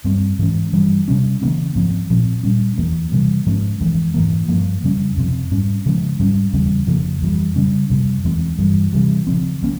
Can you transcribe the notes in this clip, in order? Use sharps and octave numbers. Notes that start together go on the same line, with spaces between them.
G2 G3 C4
G#2 E3 G#3 C#4
G2 E3 G3
C3 G3 C#4
C#3 E3 A#3 C#4
G#2 F3 C4
A#2 F3 C4
A#2 G3 C#4
E2 E3 A#3
C3 E3 G3 A#3
G#2 F3 G#3 C#4
F2 E3 G#3
G#2 E3 A#3
G2 F3 A#3
F2 C#3 G3 C#4
F2 C3 F3 C4
G#2 G3 C#4
C#3 F3 G#3 C#4
G#2 G3 C#4
E2 C#3 G3 C4
F2 C#3 F3 A#3
F2 E3 G3
C#3 G3 C#4
F2 C3 G3
E2 E3 G#3 C4
G2 E3 G3
C3 E3 G3
C#3 F3 C4
E3 A#3 C#4